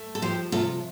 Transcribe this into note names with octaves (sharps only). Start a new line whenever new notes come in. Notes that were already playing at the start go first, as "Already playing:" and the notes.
Already playing: A3
A4
F3 G4 C5
C3 F4 A4